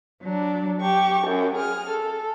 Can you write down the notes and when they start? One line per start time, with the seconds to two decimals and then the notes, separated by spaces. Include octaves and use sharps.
0.24 F#3 D4
0.80 G4 C#6
1.26 F#2
1.55 G#4 F6
1.89 A4